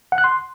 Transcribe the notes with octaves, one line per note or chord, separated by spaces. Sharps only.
F#5
F#6
C6